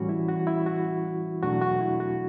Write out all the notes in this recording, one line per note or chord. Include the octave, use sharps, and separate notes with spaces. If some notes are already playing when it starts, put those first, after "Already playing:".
Already playing: A2 E3 G3 C#4 F#4
E4
F#4
E4
F#4
E2 B2 F#3 A3 D4 F#4
F#4
E4
F#4